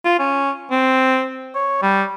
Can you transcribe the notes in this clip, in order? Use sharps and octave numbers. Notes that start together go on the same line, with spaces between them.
F4
C#4
C4
C#5
G3